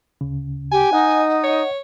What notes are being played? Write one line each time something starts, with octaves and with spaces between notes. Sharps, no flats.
D2 C#3
G4 G#5
D#4 D#5 F#5
C#5